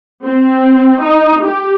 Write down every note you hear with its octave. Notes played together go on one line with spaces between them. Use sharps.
C4
D#4
G4